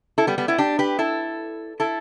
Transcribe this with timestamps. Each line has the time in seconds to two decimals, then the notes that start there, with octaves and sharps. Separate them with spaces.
0.18 E4 A4
0.27 G3 B3
0.38 G3 B3
0.48 B3 E4
0.58 D4 G4
0.79 G4 B4
0.99 E4 A4
1.80 E4 A4